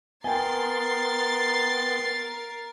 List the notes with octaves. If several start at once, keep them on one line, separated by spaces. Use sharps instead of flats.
B3 A#4 G5 G#5 C6 A6 C7